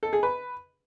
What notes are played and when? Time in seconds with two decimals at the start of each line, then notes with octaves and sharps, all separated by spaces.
0.03 A4
0.13 G#4
0.23 B4